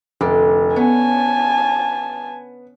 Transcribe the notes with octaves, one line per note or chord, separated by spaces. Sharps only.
F1 D3
B3 C#4 G#5 A5